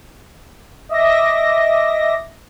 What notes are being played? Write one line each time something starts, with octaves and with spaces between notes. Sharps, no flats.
D#5 E5 D6 A#6